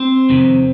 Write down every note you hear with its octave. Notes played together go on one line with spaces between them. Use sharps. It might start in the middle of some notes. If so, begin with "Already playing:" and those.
Already playing: C4 C5
F2 C3 D#3